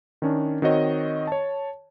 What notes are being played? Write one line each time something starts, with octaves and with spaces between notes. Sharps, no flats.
D#3 C#4 D4
D#3 C4 F#4 C#5 D#5
C#5 A5